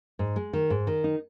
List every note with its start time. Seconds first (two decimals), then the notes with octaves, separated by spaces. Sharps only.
0.19 G#2
0.36 G#3
0.53 D#3
0.70 G#2
0.87 D#3
1.04 D#4